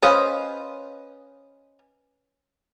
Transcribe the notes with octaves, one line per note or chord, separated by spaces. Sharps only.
C#4 B4 C5 D#5 F5